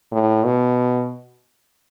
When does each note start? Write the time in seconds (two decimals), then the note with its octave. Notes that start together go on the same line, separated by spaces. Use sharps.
0.12 A2
0.45 B2